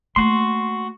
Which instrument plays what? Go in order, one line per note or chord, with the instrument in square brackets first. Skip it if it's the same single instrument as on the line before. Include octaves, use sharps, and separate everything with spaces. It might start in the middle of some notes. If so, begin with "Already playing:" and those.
[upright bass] A3 A#3 [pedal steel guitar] F#4 C6